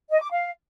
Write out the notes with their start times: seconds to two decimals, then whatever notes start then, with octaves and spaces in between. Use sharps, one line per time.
0.10 D#5
0.21 D6
0.31 F5